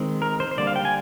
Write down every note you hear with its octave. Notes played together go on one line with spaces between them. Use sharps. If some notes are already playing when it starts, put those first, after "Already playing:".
Already playing: D#3 G#3 C4
A#4
C5
C5
D3 G3 A#3 D5
F5
G5
G#5